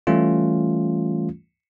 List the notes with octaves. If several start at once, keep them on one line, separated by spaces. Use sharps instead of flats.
E3 G3 A3 C#4 F4